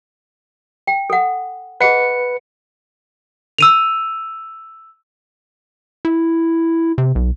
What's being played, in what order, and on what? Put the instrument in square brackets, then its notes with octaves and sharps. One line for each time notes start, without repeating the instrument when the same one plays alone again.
[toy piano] G5
A4 F#5
[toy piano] G#4 D#5 F#5 [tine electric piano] B4 C#7
[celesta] E6 D#7 F7
[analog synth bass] E4
C3
B1